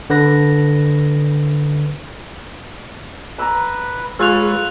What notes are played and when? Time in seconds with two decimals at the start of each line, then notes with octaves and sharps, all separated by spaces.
0.10 D3 B4 A#6
3.38 B4 A#5 D6 E6
4.19 G#3 F4 G#4 B4 C#5 E6 F#6 F7